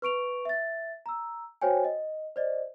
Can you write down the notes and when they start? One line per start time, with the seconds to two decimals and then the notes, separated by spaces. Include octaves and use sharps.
0.02 B4 C#6 D7 F7
0.45 E5 A6
1.06 A#5 E6
1.62 F#4 C5 C#5 G5 G#5
1.85 D#5
2.36 C5 D5 D#5